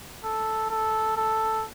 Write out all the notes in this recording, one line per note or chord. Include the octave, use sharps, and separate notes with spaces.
A4
A4
A4